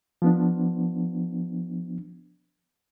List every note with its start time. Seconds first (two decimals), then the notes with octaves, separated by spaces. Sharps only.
0.22 F3 B3 D4